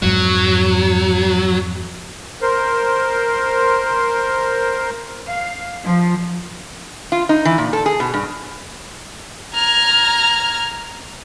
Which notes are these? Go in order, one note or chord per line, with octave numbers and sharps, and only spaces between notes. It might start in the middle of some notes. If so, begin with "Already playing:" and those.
F2 G#2 F#3
A#4 C5 C6
F5
F3
F4
D#4
E3
A#2
A4
G#4
B2
G2
A#5 F6 G#6